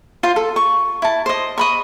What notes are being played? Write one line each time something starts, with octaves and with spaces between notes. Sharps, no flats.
F4 C5 C6
A4
C#6
E4 A5
C5 D#5
D#5 B5 C#6